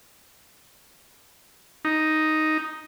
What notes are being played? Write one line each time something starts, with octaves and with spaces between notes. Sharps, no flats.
D#4